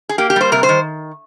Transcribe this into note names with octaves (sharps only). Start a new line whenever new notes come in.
G#4
A#3 G4
G4
G3 C5
C3 A#4
C5
D#3